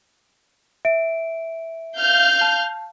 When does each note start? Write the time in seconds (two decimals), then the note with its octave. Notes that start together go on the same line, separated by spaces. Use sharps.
0.85 E5 D7
1.98 F5 F6 G6
2.41 A5